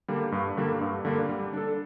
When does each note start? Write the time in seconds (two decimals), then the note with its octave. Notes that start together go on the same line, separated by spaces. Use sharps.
0.08 D3 G3 A#3
0.32 G2
0.57 D3 G3 A#3
0.81 G2
1.05 D3 G3 A#3
1.29 G3
1.53 D4 A4